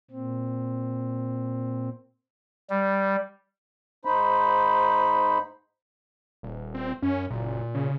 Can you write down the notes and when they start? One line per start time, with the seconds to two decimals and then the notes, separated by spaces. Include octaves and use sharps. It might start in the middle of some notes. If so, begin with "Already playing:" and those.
0.11 A#2 C4
2.70 G3
4.05 G#2 D#4 C5 B5
6.43 D#1
6.75 C4
7.02 F#2 C#4
7.30 F#1 A#2
7.75 C#3